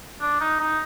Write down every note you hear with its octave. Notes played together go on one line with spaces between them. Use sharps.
D4
D#4
D#4